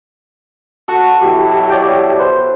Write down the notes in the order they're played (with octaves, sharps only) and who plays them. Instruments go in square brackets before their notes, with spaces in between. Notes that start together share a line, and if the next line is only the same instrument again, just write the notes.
[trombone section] F#4 [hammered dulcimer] A4
[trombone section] B2 F#3 E4 [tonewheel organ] G4
[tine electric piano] C#5 D5 G5
B4 C5